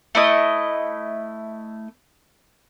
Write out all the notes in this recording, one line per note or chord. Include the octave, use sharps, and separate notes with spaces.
A3 E4 D#5